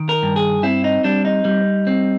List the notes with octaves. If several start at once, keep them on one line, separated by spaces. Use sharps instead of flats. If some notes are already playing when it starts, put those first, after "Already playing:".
Already playing: D#3
A#4
G2
G#4
C4 E4
D#4
G3 D4
D#4
G3
C4